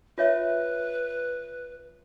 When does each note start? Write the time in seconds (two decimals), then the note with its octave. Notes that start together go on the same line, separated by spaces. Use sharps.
0.18 F4 B4 C#5 E5